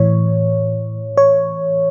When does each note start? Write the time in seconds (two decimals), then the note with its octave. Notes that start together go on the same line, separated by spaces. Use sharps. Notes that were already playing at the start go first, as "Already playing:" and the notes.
Already playing: A2 E3 C#5
1.17 C#5